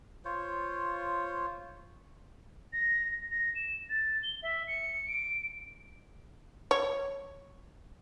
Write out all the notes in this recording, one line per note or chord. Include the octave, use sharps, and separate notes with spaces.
F4 C5 C#5
A#6
A#6
E7
A6
G7
E5
C#7
D7
C#5